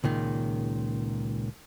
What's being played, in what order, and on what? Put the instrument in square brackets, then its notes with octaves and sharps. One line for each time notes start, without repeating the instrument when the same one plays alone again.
[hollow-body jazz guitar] C#2 A#2 D#3